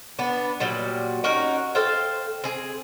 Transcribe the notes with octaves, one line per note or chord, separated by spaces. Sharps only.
B3 D4
A#2 F#3 G3
C#4 D#4 F#4 A#4
A4 C5 F5 G5
C4 G#4